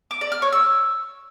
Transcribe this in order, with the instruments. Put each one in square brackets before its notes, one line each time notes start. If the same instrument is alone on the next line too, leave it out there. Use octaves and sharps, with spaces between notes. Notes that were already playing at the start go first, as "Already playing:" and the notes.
[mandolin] D6
D5
F6
C#5
E6